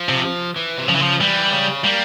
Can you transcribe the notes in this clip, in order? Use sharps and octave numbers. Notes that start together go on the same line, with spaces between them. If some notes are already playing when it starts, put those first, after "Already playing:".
Already playing: F3
C3
E3
C3
C#3 F3
E3
F3
E3 G3
C#3
G3 A#3